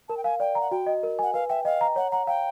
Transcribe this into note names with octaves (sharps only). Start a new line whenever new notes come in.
A#4 A5
G5
F5 G#5
D5 G5
A#5
F#5
F#4 G5
D#5
A#4
F#5 G#5
B4 F5
E5 G5
D#5 F5
A#5
C#5 F#5
F#5 A#5
F5 G5